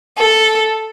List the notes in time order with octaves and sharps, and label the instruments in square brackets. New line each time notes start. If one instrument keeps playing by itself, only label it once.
[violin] A4